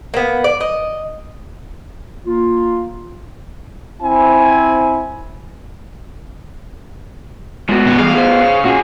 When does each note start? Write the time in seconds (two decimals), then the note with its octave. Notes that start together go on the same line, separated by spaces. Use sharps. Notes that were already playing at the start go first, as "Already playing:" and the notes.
0.14 A#3 B3
0.44 D5
0.61 D#5
2.25 A#3 F4
4.02 C4 E4 G#5
7.69 A2 G#3 B3 F#4
7.86 B2 C#4
7.98 E3 G3 G#4 F5
8.15 G#4 C5
8.42 C#3
8.64 A#2 C#4 F4 F#4 G#4